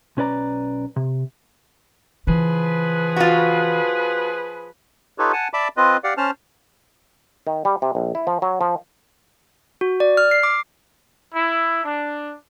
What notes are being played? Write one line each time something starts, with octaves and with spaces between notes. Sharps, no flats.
B1 C#4 B4 D5 A#5
C3
C#3 E3 F3 G#4 B4
F4 F#4
D#4 F4 G4 A4 B4 C#5
F#5 G#5 A5
D5 E5 A5 B5 D6
C4 F4 B4 D#5
G4 D5 F5 F#5
C#4 C5 A5 F6
D#3
G3
C3
A#1
E4
F3
F#3
F3
F#4
D5
F6
C7
D6
E4
D4